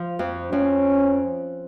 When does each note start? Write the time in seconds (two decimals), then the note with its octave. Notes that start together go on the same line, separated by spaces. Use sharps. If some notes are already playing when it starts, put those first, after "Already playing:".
Already playing: F3
0.19 F2
0.52 F2 C#4